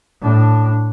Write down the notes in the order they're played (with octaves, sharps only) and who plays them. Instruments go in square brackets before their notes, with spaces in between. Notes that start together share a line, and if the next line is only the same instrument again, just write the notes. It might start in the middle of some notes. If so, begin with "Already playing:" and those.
[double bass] A2 D4